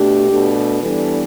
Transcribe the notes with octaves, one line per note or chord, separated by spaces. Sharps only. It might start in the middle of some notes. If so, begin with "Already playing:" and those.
Already playing: B2 A3 D4 G4
B2 A3 D4
E3 G3 B3 D4 A4